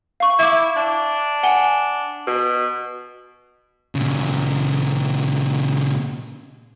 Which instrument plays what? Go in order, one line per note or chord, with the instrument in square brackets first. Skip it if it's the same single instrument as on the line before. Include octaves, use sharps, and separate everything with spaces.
[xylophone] F5 C#6
[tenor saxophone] E4 [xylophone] E5 D6
[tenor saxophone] D4
[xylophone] F#5 G#5 G7
[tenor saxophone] B2
[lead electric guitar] A#2 C#3